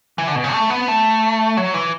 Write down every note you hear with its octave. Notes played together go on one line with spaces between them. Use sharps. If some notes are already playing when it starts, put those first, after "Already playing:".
E3
D3
B2
C#3
A3
B3
A3
F#3
E3